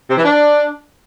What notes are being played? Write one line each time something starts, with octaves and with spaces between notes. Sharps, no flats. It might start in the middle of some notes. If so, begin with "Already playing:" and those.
C3
E3
D4